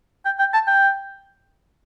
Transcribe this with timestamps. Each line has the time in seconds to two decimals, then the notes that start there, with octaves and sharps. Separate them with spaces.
0.25 G5
0.39 G5
0.53 A5
0.67 G5